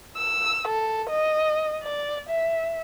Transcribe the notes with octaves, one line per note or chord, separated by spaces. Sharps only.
E6
A4
D#5
D5
E5